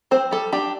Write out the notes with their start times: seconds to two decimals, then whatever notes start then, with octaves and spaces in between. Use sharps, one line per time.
0.11 C4 C5
0.31 G3 A4
0.52 D4 G4